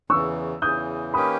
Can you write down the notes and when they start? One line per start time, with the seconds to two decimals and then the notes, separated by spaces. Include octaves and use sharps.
0.10 E2 C#3 E3 C#6 E6
0.62 E2 C#3 E3 D#6 G6
1.14 D#3 A#3 C#4 G4 B4 B5 D#6